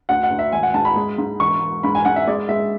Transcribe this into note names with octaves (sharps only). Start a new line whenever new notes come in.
D2 F#5
F#5
D2
E5
G#1 G#5
F#5
G#2 A5
B5
G#3
G#2
E1 C#6
E1
G#2 B5
G#5
G#2 F#5
E5
G#3 D5
G#3 E5